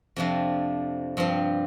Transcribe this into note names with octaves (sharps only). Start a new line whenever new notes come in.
F2 C3 F3 D4
G2 F3 C4